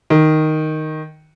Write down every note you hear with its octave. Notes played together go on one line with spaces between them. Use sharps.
D#3